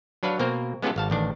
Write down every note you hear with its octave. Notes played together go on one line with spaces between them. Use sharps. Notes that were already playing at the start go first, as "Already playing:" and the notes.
F#3 D4 B4 C#5 F5
B2 A#3 C4 A#4 C5
G#3 B3 C#4 F4 G4 A4
G#1 F5 A5
A1 D#3 D4